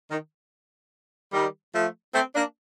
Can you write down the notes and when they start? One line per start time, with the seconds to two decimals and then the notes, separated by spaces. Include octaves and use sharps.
0.11 D#3
1.33 D#3 G3
1.74 F3 A3
2.15 A3 C4
2.36 A#3 D4